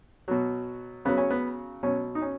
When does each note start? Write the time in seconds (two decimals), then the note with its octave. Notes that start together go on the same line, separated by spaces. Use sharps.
0.28 B2 F#3
1.05 C#3 F#3 B3
1.18 C#4
1.30 B3
1.83 B2 F#3 C#4
2.15 D#4
2.22 C#4